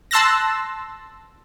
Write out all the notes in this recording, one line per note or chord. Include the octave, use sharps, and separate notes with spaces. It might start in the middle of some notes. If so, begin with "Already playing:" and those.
A5 C6 E6 F#6 A6 A#6